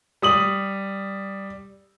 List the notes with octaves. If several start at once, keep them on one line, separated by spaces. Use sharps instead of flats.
G3 D#6 F#7